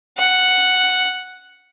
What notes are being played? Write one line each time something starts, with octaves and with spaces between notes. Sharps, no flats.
F#5